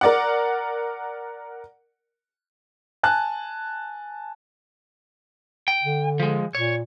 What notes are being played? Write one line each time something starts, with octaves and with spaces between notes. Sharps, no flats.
A#4 D5 F#5
G#5 A5 F#6
G5
D3
F3 G#3
A#2 C#5